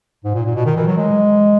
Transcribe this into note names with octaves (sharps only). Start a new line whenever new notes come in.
G#2
A#2
A#2
B2
D#3
E3
F#3
G#3